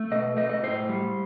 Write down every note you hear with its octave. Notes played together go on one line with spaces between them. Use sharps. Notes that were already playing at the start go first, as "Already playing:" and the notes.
Already playing: A3
B2 D#5
A3 D#5
D#5
A2 C5
G3